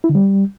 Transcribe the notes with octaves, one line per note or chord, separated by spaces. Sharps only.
E4
D3
G3